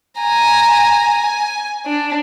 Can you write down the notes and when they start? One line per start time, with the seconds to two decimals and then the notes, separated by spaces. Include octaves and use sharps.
0.20 G#5 A#5
1.19 G#5
1.86 D4